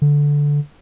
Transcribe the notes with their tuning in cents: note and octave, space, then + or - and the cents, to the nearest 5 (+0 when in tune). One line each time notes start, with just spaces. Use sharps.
D3 -10